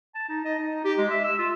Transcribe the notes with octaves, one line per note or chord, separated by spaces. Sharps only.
A5
D#4
D#5
D#4
G4
G#3
E5
E6
F4